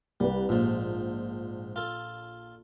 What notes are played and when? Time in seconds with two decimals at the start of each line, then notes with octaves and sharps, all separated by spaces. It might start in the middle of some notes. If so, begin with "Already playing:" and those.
0.20 C2 G3 B4
0.49 A#1 G#2 F3
1.76 F4 A4